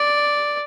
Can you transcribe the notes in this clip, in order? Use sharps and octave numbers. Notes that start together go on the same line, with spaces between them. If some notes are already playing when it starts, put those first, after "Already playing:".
Already playing: D5